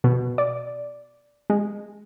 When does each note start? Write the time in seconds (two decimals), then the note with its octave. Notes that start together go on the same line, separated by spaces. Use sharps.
0.04 B2
0.38 D5
1.50 G#3